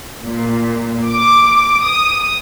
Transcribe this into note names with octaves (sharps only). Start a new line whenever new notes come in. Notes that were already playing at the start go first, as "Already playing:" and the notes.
A#2
D6
D#6